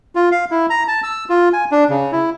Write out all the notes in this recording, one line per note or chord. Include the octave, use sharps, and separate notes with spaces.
F4
F5
E4
A#5
A5
E6
F4
G#5
D4
C#3
E4